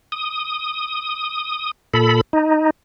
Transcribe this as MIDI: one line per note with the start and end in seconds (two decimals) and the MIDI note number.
0.12 1.71 87
1.94 2.21 46
1.94 2.21 69
1.94 2.21 83
2.33 2.70 63